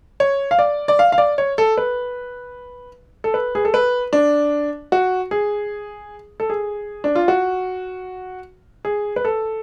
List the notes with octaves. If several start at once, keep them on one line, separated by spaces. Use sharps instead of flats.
C#5
F5
D5
D5
F5
F5
D5
C#5
A4
B4
A4
B4
G#4
A4
B4
D4
F#4
G#4
A4
G#4
D4
F4
F#4
G#4
B4
A4